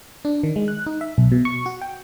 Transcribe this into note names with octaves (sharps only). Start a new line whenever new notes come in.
D4
D#3
G#3
F#6
D#4
E5
B1
B2
C#6
F#4
G5